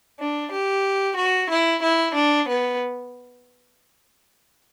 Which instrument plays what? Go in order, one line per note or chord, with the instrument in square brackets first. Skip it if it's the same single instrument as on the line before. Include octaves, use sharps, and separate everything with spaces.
[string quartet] D4
G4
F#4
E4
E4
D4
B3